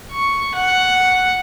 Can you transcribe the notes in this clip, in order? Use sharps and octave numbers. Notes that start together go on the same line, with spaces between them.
C#6
F#5